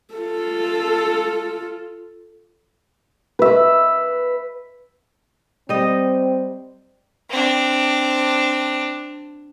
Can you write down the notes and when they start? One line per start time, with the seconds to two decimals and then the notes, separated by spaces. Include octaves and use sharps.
0.15 F4 A4
3.39 B4 E5
5.69 G3 C4 D#5
7.30 C4 D4